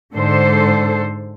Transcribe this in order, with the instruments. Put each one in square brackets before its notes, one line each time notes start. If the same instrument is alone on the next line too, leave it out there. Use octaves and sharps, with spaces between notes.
[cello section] G#2 D3 A4 C5